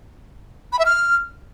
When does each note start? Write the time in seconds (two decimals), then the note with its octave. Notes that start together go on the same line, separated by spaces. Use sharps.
0.73 B5
0.79 E5
0.86 F6